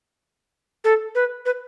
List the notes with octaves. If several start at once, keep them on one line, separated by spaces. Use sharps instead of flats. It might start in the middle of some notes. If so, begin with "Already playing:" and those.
A4
B4
B4